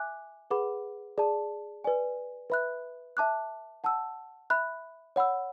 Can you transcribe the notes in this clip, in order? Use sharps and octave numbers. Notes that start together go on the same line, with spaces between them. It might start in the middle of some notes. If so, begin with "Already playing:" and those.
Already playing: E5 G#5 D6 F#6
G#4 B4 F#5 B5 D6
G#4 D5 A5
B4 D5 G#5
B4 E5 B5 F#6
E5 A5 D6 F#6
F#5 A5 E6
E5 B5 F#6
C#5 F#5 B5 E6